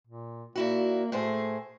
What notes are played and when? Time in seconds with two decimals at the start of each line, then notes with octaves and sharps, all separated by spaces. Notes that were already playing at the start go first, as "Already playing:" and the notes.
0.07 A#2
0.55 A#2 A#3 E4 F#4
1.12 A2 A3 G#4 C5